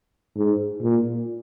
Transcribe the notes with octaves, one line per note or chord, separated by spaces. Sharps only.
G#2
A#2